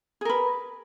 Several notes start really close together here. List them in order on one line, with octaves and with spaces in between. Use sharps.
G#4 A#4 B4